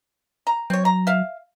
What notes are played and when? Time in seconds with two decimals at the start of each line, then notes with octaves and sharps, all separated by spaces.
0.47 A#5
0.70 F#3 C4 C#5
0.85 A#5
1.07 E5 F5